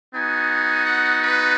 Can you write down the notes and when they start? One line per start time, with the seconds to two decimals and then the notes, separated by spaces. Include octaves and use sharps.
0.15 B3 D#4 F#4 G#5
0.86 F#5
1.22 B4